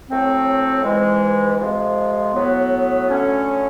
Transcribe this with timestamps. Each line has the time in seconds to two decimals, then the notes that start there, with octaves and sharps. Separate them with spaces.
0.09 A2 F#3 A3 C4
0.84 G#2 E3 G#3
1.59 F2 C3 F3 G#3
2.34 A2 F#3 B3
3.09 D3 F#3 A3 C#4